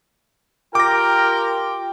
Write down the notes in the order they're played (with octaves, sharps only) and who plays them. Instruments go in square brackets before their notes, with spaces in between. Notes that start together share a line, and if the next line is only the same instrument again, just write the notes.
[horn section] F4 G4 G5 [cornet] A#4 [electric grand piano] D6 A#6